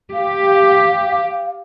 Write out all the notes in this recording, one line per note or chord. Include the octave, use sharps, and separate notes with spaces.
G4 F5